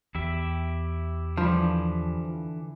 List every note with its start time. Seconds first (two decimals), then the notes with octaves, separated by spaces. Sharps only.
0.15 E2 E4 G4 E5
1.37 D3 E3 F3 G3